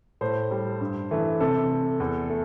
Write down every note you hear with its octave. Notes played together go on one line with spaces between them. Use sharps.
A2 C5
G3
G2
E3 A3
C3 A4
A3
E2
A3